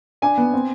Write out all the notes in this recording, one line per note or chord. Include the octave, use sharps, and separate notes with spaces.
D4 G#5
B3
C4